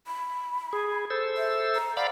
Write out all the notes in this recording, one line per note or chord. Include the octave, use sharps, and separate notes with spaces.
B5
G#4
A4 C5 E6
E5
A#5
D5 F5 F#5 B5